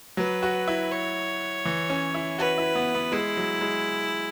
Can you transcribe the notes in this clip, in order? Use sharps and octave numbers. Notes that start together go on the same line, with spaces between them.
F#3 B4
F#4
E4
C#5
E3
C#4
E4
F#4 B4
E4
B3
B3
G#3 E4
F#3
G#3